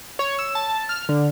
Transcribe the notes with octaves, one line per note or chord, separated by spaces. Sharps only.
C#5
E6
A5
F6
D3